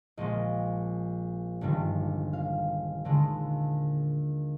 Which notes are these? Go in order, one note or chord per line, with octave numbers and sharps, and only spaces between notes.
A#1 A#2 F3 G#3 D#5
G1 G2 D#3 G3
F5
D#2 D3 G#3